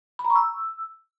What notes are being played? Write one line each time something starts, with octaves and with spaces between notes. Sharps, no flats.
B5
A#5
C#6
E6